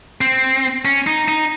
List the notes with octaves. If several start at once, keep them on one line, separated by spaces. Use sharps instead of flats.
C4
C#4
D#4
D#4